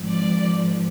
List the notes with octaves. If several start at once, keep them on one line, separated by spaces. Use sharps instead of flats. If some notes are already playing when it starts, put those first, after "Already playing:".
Already playing: G#1 G#2 F3
D5